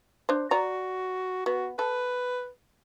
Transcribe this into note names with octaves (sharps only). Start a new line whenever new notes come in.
D4 C5
F#4 D5 A#5
B3 F#4
A4 B4